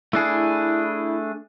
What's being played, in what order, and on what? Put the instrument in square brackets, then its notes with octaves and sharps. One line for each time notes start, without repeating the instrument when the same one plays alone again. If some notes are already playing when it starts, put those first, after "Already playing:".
[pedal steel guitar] A3 D4 G#4 [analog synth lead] E4